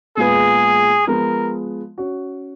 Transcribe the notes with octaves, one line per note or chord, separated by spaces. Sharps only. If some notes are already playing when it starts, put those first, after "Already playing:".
A#2 G#3 B3 F4 G#4 B4
F3 G#3 B3 A#4
C#4 F#4